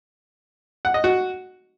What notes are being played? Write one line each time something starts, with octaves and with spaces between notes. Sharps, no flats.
F#5
D#5
F#4